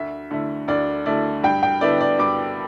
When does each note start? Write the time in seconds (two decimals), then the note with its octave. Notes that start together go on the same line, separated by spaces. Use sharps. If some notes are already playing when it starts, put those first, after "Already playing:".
Already playing: D2 E5
0.31 D3 A3 E4
0.68 D2 D5
1.06 D3 A3 E4 D5
1.44 G2 G5
1.63 G5
1.81 D3 B3 E4 D5
2.01 D5
2.19 G2 D6